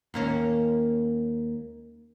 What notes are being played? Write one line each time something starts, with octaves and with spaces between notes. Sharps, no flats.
D#2 A#3 C#4